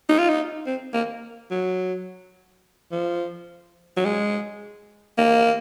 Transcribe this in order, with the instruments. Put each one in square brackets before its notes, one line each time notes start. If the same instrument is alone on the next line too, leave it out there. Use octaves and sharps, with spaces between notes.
[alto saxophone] D#4
F4
D#4
C4
A#3
F#3
F3
F#3
G#3
A#3